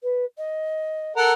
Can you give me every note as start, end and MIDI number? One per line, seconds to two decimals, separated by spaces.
0.03 0.25 71
0.37 1.12 75
1.16 1.33 69
1.16 1.33 70
1.16 1.33 78